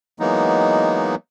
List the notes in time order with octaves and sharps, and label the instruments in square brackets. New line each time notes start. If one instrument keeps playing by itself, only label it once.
[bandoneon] E3 F#3 G#3 A#3 B3 D#4